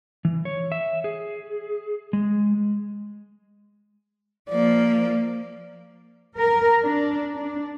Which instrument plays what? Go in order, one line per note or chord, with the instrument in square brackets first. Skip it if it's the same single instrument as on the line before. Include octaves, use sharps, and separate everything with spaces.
[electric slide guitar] E3
C#5
E5
G#4
G#3
[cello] F3 A#3 [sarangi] D5
[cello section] A#4
D4
D4